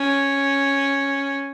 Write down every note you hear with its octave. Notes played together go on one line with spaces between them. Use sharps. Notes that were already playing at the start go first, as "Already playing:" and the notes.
Already playing: C#4